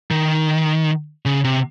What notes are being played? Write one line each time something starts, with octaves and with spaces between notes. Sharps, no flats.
D#3
C#3
C3